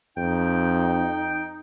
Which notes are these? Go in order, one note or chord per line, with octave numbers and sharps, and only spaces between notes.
F2 D#4 G5